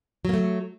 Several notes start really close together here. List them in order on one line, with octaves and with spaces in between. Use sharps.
F#3 A#3 A3